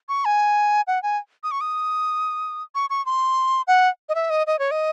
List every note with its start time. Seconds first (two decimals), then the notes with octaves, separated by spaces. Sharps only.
0.09 C#6
0.25 G#5
0.87 F#5
1.03 G#5
1.43 D#6
1.51 C#6
1.61 D#6
2.75 C#6
2.90 C#6
3.06 C6
3.67 F#5
4.09 D#5
4.15 E5
4.30 D#5
4.47 D#5
4.59 C#5
4.71 D#5